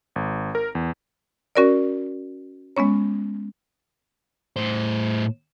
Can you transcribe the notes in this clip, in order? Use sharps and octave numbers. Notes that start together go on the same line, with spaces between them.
G#1
A#4
E2
C#4 F#4 A#4 C#5 D5
G#3 B3 C#4 C#5
A2 C5